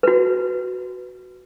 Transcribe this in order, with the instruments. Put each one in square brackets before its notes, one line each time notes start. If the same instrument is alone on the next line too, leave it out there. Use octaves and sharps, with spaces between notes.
[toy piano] F#4 B4